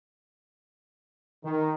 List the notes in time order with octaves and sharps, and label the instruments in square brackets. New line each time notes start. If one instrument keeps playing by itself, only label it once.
[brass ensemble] D#3